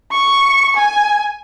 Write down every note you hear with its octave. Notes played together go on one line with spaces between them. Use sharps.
C#6
G#5